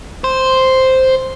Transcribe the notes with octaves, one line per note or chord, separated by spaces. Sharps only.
C5